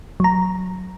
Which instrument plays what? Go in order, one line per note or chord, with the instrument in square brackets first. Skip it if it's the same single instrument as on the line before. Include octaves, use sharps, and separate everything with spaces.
[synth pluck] F#3 A#5